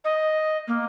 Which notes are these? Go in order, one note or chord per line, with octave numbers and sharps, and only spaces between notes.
D#5
A#3